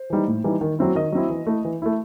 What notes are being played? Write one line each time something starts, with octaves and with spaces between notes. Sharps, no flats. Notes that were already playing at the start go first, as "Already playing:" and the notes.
Already playing: C5
E3 G3 D#4
A2
E3 G3 D#4
D#3
F#3 C4 E4
D#3 D#5
F#3 C4 E4
E3
A3 E4
E3
A3 E4